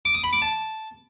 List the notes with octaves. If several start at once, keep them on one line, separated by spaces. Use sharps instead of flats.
D6
D#6
B5
D6
A5